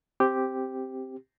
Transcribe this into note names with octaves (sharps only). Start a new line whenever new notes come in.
C4 G4